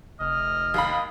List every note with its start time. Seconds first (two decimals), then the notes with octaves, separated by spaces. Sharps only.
0.20 F1 D#5 F6
0.74 D#2 F5 B5